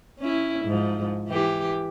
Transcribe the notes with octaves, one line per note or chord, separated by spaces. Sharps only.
C#4 E4
G#2 F3
E3 G4